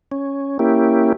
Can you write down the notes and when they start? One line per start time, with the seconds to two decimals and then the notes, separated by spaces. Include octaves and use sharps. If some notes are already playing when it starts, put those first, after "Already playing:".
0.12 C#4
0.59 A#3 C#4 E4 G4